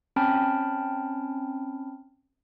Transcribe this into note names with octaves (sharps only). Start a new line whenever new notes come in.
C4 C#4 G5 A5 B5 F6